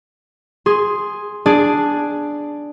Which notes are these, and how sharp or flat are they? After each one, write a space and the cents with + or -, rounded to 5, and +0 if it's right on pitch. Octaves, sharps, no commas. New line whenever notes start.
G#4 +0 C6 +5
D4 +0 G#4 +0